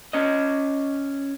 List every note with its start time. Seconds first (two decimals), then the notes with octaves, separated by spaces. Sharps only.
0.13 C#4 D#5